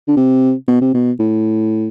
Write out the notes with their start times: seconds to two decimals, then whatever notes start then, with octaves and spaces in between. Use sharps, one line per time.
0.08 D3
0.17 C3
0.68 B2
0.81 C3
0.94 B2
1.19 A2